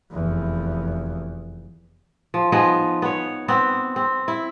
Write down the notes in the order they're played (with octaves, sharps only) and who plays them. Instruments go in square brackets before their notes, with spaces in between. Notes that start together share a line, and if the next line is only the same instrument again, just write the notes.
[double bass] F1 E2
[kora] F3
F3 B3 D#4 G#4
B3 C#5
B3 C4
C4
E4